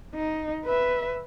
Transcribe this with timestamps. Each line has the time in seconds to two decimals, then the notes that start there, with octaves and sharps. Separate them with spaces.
0.15 D#4
0.65 B4 E5